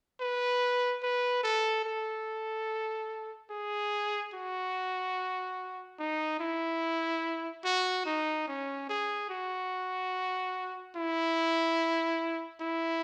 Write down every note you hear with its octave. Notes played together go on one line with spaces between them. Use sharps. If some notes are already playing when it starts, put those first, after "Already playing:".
B4
B4
A4
A4
G#4
F#4
D#4
E4
F#4
D#4
C#4
G#4
F#4
E4
E4